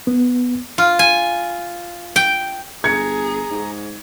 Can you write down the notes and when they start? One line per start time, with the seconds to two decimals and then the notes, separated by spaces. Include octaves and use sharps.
0.07 B3
0.78 F4
0.99 G#5
2.16 G5
2.84 G1 G#4 A#5 G#6 C#7
3.51 G#2